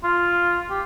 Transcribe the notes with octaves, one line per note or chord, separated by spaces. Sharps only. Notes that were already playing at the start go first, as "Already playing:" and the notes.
F4
G4